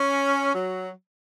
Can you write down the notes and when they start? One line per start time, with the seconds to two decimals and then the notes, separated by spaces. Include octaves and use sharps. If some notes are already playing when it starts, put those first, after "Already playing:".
Already playing: C#4
0.54 F#3